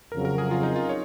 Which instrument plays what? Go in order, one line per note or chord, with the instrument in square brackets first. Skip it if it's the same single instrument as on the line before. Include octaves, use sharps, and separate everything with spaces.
[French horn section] F2 C#3 F#3 [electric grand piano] A#4
[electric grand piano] A#4
G#4
F4
D#4
F4
C#5